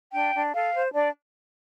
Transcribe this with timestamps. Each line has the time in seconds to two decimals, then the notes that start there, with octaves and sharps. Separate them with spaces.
0.13 D4 G5
0.34 D4
0.54 A4 F5
0.74 C5
0.94 D4 D5